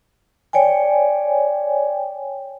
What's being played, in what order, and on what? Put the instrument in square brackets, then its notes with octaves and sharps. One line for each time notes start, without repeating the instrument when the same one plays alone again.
[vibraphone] C#5 D5 G5 G#5